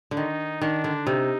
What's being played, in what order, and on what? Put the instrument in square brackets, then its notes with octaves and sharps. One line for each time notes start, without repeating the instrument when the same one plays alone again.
[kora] D3
[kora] D#3 [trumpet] D#4
[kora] D#3 [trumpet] D4
[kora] D3
[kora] C3 [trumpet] D#4